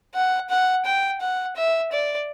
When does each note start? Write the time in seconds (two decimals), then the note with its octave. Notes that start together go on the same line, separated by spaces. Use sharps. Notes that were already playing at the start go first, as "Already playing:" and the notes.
0.15 F#5
0.50 F#5
0.85 G5
1.21 F#5
1.56 E5
1.92 D5